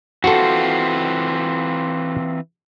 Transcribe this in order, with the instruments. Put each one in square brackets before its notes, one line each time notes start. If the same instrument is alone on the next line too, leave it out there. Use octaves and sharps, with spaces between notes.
[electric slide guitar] E3 C4 F4 [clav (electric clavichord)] F#4 A4